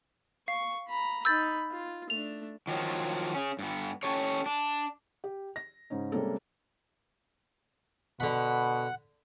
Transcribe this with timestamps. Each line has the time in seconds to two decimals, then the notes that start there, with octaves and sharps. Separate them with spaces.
0.48 F5 C#6
0.88 A#5 B5
1.25 D#4 B5 E6 G6 A6
1.71 F4
2.10 A3 D4 F7
2.67 D#3 F3 F#3
3.34 C#4 G#4
3.59 G2 B3
4.03 C#4 G4 A4 C#5
4.46 D4
5.24 G4
5.56 A#6
5.90 G#2 C#3 C#4 D#4
6.12 C3 G3 G#3 A#3 C#4 A4
8.20 B2 D3 F#5 B5